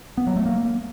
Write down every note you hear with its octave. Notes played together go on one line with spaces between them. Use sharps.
B3
F#3
A3
A#3